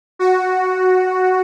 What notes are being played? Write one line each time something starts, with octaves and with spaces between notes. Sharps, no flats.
F#4